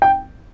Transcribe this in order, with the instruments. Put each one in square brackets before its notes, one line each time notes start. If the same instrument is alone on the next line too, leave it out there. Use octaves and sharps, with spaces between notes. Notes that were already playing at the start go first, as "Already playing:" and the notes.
[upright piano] G5